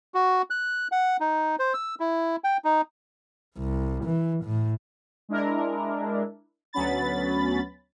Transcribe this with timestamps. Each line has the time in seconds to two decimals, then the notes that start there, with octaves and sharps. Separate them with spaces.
0.14 F#4
0.50 F#6
0.92 F#5
1.20 D#4
1.59 C5
1.74 E6
2.00 E4
2.44 G5
2.65 D#4
3.57 C2
4.04 E3
4.44 A2
5.29 G#3 D4 E4 A#4
6.73 D2 F#3 B3 C#4 B5 A6